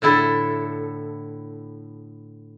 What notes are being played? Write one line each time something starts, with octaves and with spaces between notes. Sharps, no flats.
A2 D3 E4 A4